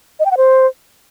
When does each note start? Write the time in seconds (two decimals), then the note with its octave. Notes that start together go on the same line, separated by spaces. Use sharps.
0.20 D#5
0.25 G5
0.31 F#5
0.37 C5